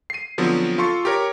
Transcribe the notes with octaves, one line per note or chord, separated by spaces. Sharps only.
C7 D#7
D3 F3 F#3 B3 C4
F4 A4 C6 C#6
G4 A#4 C#5